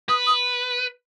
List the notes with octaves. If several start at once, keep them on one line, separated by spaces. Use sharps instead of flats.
B4 D#6
D#6